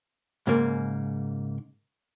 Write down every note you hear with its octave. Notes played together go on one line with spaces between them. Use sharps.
G#2 C#3 A#3